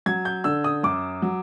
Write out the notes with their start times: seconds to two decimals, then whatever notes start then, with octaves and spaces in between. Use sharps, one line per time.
0.06 F#3 G#6
0.25 G6
0.44 D3 E6
0.64 D#6
0.83 F#2 D6
1.22 F#3